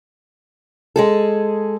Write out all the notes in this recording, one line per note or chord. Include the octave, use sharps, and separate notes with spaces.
G#3 G#4 A4